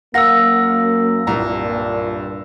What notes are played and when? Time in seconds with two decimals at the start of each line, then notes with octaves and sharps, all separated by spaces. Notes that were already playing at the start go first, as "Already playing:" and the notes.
0.14 F#2 A#3 A#4 F5 F#5 E6 A#6
1.27 C2 G2 A#2 A#5